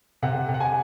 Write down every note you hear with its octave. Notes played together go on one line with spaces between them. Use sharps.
C3 F#5
C3
F#5
G#5